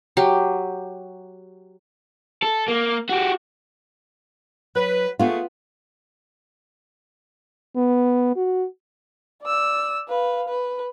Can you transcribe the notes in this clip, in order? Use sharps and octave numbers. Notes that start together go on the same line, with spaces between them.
F#3 G4
A4
A#3
F#4 G4
F#3 B4
A3 B3 F4 F#4 G#4
B3
F#4
D5 E6
B4 F5
B4